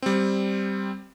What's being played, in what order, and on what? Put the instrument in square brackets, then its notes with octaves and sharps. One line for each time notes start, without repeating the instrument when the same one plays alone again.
[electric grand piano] G3 C4